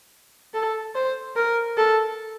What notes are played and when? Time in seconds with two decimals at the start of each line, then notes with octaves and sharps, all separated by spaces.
0.54 A4
0.95 C5
1.36 A#4
1.77 A4